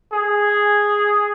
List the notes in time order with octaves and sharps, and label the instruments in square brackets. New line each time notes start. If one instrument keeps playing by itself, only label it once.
[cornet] G#4